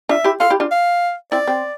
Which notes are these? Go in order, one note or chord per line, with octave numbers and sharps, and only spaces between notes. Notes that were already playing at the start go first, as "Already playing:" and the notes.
D4 F4 E5
E4 G4
F4 A4 F5
E4 G4
D4 F4
F5
C4 E4 D5
C4